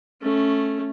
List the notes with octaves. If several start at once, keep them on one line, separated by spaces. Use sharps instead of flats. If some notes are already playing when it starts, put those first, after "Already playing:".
A3 C#4